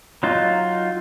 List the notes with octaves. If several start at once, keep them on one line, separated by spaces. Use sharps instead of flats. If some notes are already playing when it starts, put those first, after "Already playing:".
F#3 D#4 F4